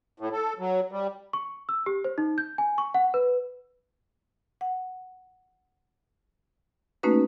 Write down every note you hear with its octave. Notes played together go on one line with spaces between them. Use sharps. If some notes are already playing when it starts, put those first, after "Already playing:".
A2
A4
F#3
G3
C#6
E6
G4
C5
D#4
G6
G#5
C#6
F#5
B4
F#5
A3 A#3 C#4 D#4 F#4 B4